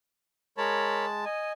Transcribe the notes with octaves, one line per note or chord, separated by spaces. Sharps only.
G#3 A#4 C#5 A5 B5
D#5 G#5